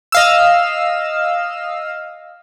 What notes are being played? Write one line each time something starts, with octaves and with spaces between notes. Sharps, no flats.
D#5 F5 E6